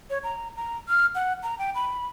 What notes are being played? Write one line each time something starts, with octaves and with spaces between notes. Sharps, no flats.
C#5
A#5
A#5
F6
F#5
A#5
G5
B5